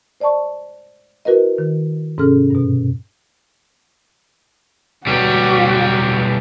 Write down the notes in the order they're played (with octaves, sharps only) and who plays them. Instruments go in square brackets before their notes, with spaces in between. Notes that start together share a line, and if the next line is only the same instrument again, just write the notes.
[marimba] C5 D5 D#5 A5 C#6
E4 F#4 A#4 B4 D#5
D#3
G#2 C3 C#4 G#4 A4 F6
G2 B2
[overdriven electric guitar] B1 G3 [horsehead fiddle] F#4